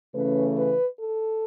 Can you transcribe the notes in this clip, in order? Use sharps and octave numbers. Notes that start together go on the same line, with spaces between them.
C#3 E3 A3 C#4 B4
B4
A4